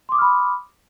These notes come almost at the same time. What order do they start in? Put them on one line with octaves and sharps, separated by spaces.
C6 D6 D#6 F6 B5